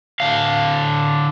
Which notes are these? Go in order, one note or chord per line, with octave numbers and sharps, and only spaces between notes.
D3 F5